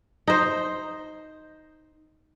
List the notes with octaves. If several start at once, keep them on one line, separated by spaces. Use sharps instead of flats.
D#4 C5